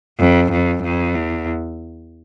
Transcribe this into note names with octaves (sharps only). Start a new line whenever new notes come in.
F2
F2
F2
E2